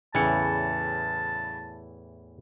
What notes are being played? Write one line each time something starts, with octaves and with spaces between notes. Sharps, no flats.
E2 A2 C#3 E3 A5 C#7